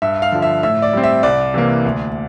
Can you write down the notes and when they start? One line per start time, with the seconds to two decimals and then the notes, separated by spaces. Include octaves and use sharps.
0.02 G2 E5
0.22 F5
0.32 D3 F3
0.42 E5
0.63 A2 E5
0.82 D5
0.93 G3 C4
1.04 E5
1.23 C2 D5
1.54 C3 E3 A#3
1.85 D2